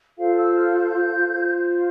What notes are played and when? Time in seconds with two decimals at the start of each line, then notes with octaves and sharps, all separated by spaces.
0.17 F4 A4 C5 F5
0.35 E6
0.55 F6
0.73 G6
1.28 F4 C5